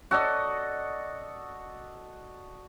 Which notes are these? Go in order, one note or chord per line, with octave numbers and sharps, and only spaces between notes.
F#4 A4 D5 D#5